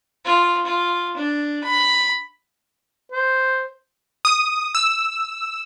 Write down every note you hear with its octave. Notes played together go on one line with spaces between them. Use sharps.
F4
F4
D4
B5
C5
D#6
E6